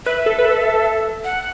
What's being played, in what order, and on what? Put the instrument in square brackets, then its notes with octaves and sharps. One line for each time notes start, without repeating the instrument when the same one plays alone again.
[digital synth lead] B4 [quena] E5
[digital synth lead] A4
B4
A4
[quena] F#5